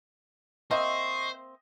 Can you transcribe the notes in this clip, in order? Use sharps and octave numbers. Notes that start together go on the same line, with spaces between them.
A#3 C4 C5 D#5 E5 C#6